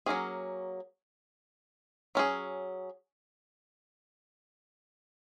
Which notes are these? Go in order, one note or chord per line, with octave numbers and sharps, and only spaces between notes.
F#3 A#3 C#4 G#4
F#3 C#4 G#4